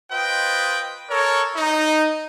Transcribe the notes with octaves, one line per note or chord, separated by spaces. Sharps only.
F4 B4 C5 D#5 G5
A4 A#4 C#5
D#4